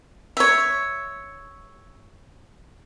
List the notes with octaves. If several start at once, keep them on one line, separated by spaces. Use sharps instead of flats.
C#5 E5